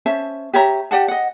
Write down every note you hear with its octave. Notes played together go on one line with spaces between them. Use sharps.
C#4 C5 E5 A5
G4 C#5 E5 A#5
G4 D5 F#5 A5
D#5 F#5